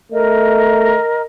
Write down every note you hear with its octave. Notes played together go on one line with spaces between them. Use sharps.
A3 A#4 D#5